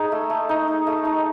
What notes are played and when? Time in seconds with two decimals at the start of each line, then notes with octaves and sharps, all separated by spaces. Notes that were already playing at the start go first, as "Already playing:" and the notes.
Already playing: D#4 G#4
0.12 A3
0.30 A3
0.49 D#4
0.68 D#4
0.87 A3
1.05 D#4